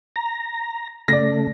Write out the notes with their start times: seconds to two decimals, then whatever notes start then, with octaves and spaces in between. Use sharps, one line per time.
0.16 A#5
1.08 C#3 A3 D5 A#6